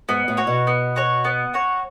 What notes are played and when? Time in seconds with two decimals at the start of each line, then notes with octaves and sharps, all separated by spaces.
0.09 G#2 B3
0.28 A2
0.37 F#4 C#5
0.47 B2
0.67 B3
0.96 F#4 C#5
1.25 B3
1.54 F#4 C#5